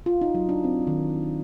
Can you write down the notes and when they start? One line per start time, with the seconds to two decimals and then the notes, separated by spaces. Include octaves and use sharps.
0.06 F4
0.21 D#4
0.35 F#3
0.49 D4
0.64 C4
0.87 D#3